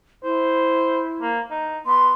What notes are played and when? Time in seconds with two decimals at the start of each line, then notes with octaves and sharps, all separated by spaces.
0.24 E4 C5
1.22 A#3
1.51 D#4
1.87 B3 C6